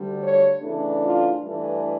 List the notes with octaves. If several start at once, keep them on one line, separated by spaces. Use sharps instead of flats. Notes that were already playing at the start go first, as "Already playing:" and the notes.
Already playing: D2 D3 G3
C#5
C#3 E3 A3 D4
F4
G2 E3 A3 D4